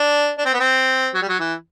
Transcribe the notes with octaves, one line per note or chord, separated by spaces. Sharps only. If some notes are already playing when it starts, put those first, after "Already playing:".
Already playing: D4
D4
C4
B3
C4
F#3
G3
F#3
E3